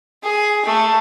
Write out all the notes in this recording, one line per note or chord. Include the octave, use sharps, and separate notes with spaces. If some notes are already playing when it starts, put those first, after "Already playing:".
G#4
A3